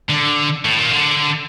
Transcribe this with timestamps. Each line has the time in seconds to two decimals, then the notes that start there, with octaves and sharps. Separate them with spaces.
0.10 D3
0.65 A2
0.78 A#2
0.92 D3